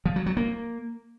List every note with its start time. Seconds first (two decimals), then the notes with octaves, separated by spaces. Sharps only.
0.06 F3
0.16 F#3
0.26 F#3
0.37 A#3